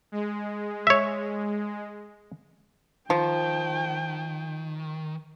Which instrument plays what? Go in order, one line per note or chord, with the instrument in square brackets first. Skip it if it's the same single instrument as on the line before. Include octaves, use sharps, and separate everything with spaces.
[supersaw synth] G#3
[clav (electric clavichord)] C#5 E5
[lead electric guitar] D#3 [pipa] F3 [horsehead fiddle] G5